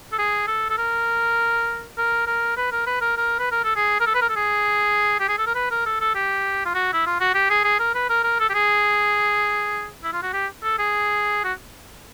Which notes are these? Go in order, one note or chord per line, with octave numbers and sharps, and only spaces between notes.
A4
G#4
A4
A4
A#4
A#4
A#4
B4
A#4
B4
A#4
A#4
B4
A#4
A4
G#4
A#4
A4
B4
A#4
A4
G#4
G4
G#4
A4
A#4
B4
A#4
A4
A4
G4
F4
F#4
E4
F4
F#4
G4
G#4
G#4
A#4
B4
A#4
A#4
A4
G4
G#4
E4
F4
F#4
G4
A4
G#4
F#4